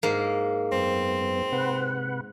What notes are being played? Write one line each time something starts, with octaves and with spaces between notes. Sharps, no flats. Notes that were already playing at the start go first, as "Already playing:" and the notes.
G#2 A#3
F#2 B3 C4
C3 B4 F#5